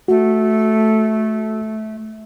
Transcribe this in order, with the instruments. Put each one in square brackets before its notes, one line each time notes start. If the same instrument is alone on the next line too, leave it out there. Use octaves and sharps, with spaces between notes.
[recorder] A3 [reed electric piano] F#4